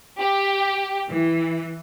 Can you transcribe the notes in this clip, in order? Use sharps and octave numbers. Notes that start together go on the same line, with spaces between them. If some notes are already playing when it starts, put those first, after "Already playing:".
G4
E3